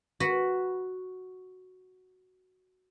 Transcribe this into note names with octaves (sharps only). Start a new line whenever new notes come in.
F#4 B4